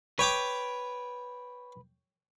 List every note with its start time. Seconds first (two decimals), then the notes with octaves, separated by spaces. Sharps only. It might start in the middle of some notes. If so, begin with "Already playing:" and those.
0.19 B4 C#5 G5 D6